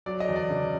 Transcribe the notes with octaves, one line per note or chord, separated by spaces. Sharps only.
F#3 D5
D#5
E2
D5
C#3